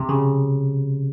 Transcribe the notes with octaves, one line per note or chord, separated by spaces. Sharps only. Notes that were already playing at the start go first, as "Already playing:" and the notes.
Already playing: C3
C#3